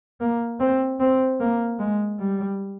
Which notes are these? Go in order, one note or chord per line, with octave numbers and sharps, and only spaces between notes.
A#3
C4
C4
A#3
G#3
G3